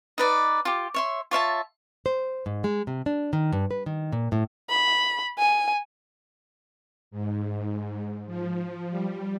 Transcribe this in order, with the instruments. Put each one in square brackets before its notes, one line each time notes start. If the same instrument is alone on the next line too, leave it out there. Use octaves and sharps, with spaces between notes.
[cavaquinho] D#4 B4 D5
F4 G4
C#5 E5 C6
F4 C#5 E5 A5
[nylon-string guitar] C5
G#2
G#3
C3
D4
D#3
G2
B4
D#3
A#2
A2
[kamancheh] B5
G#5
[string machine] G#2
F3
G3